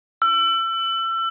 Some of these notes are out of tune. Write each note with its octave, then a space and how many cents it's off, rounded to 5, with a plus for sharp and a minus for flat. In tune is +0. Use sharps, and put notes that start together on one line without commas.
E6 +30